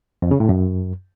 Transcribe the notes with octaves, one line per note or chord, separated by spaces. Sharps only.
F2
C#3
A2
F#2